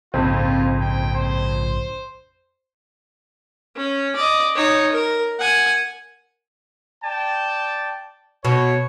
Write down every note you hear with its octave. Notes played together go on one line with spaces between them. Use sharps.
A#1 F2 G#2 C#3 C4 F4
G5
C5
C#4
D5 D#5
D#4 C#5
A#4
F#5 G#5
D5 G5 A5
B2 C#5